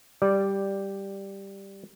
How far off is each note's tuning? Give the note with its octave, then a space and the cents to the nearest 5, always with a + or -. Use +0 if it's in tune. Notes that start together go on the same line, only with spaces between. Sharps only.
G3 +0 D5 +0